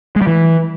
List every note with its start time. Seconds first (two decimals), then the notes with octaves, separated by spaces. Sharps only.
0.16 G#3
0.22 G3
0.27 E3